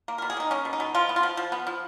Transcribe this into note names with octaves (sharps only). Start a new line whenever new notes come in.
A#3
B2 A#4
G#4
A#3 D#4
A#3 C#4
B2
D#4
B2
F3 F4
B3
F4
F3
F3
B3
F3